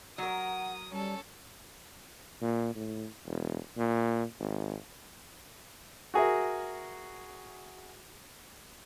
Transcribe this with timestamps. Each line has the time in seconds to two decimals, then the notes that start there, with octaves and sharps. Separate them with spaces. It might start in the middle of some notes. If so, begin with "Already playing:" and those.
0.18 F#3 A#4 F#5 D#6
0.91 G3 C#4 A4
2.41 A#2
2.75 A2
3.26 E1
3.77 A#2
4.39 G#1
6.14 F#4 G#4 A#4 E5